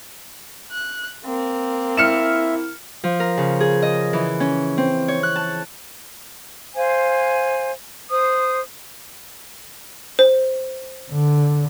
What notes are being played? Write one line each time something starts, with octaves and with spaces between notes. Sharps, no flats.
F#6
A#3 C4
E4 E5 F6 C#7 E7
F3
A#4
C#3
G#4
D#5
E3
C#4
C4
C#5
F#6
A5
C5 F5 G#5
C5 D#6
C5
D3